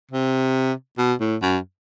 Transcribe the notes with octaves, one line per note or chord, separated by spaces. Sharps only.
C3
B2
A2
F#2